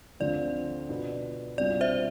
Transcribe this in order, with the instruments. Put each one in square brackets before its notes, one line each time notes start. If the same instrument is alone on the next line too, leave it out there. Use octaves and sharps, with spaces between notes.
[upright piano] D2 D3 F3 C4 F4 [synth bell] D5
[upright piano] B2 B3 D4 F4
[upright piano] C2 B2 G3 D4 F4 [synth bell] D5
[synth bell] C5 E5